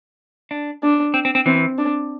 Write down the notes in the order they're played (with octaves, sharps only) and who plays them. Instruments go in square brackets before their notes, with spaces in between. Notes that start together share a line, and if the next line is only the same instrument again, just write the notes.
[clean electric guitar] D4
[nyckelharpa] D4
[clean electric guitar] C4
C4
C4
[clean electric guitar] E3 [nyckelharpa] C4
[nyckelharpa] D4